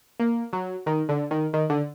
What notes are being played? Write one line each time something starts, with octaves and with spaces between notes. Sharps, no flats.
A#3
F#3
D#3
D3
D#3
D#3
D3